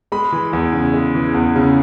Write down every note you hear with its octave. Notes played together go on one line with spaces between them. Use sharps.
G#3 B5
E3
E2
C#3
G#3
E3
E2
C#3